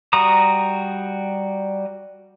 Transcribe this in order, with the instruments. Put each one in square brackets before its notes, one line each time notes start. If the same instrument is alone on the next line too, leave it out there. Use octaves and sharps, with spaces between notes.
[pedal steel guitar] G3 F#4 A#5 D#6